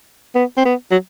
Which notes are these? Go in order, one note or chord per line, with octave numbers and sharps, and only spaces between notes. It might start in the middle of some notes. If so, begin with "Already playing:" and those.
B3
C4
B3
F#3